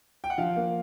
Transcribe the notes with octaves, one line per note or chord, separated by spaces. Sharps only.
G5
F#5
F3 F5
A#3